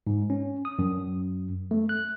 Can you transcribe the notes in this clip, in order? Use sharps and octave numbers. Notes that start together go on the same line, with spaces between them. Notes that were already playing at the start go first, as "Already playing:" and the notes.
G#2
C#4
D#6
F#2
A3
F#6